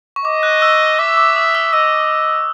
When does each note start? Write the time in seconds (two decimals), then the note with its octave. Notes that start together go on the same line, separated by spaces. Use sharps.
0.16 C#6
0.25 D#5 D6
0.43 F#6
0.62 E6
0.99 E5 D6
1.17 D6
1.36 D#6
1.55 E6
1.73 D#5 E6